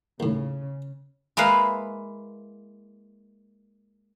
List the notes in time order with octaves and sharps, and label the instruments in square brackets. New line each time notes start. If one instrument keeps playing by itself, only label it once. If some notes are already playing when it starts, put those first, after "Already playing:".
[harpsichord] D#2 A2 [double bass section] C#3
[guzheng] G#3 A#3 E4 B4 F5